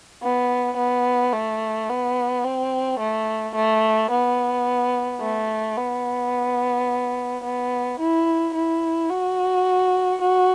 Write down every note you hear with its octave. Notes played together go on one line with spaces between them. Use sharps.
B3
B3
A3
B3
C4
A3
A3
B3
A3
B3
B3
E4
E4
F#4
F#4